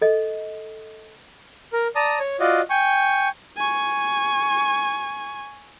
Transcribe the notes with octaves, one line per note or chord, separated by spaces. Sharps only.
A4 D#5
A#4
D5 A5 A#5 D#6
C#5
F4 F#4 D5 D#5
G5 G#5 C#6
G#5 C#6